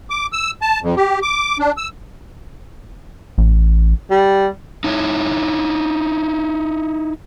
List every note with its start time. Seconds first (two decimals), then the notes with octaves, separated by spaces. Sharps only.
0.10 D6
0.32 E6
0.62 A5
0.82 F2
0.96 G4
1.22 D6
1.59 D4
1.77 E6
3.38 A1
4.11 G3
4.84 D#4 E4 C#5